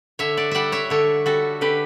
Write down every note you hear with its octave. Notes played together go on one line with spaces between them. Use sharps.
D3 C#5 E5
D5 F#5
G3 D5 E5 F#5
C#5 E5
D3 A4 C#5
G3 F#4 A4
D3 G4 B4